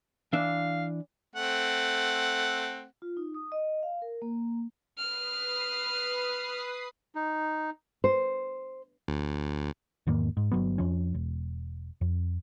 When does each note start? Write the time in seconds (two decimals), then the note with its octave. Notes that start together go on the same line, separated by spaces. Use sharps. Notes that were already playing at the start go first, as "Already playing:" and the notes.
0.33 E3 D4 E5 F5
1.36 A3 C4 F#5
3.02 F4
3.17 D#4
3.34 D#6
3.52 D#5
3.83 F5
4.02 A#4
4.22 A#3
4.98 B4 D#6 F6 C7
7.15 D#4
8.04 C5
9.08 D2
10.07 E2 G#2 D#3 A#3
10.37 G#2
10.51 G1 F#3 B3
10.78 F2 F3 C#4
11.14 E1
12.01 F2